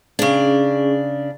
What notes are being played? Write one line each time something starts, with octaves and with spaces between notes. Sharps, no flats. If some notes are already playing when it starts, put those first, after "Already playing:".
C#3 C#4 D4 G#4